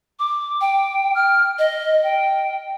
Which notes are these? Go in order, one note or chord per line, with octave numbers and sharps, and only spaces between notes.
D6
G5
F6
D#5
G5